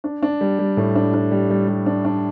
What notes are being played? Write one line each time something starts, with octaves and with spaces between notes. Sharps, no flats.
D4
D4
G3
G3
A2
D4
D4
G3
G3
G3
D4
D4